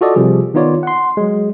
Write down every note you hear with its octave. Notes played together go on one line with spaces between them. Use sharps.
F4 F#4 A4 D5 D#5
C3 F3 G3 G#4
D#3 B3 D#4 F4 C#5 D5
F#5 C6
F#3 G#3